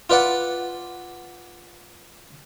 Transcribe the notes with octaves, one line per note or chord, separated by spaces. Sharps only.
F4 B4 D5 F#5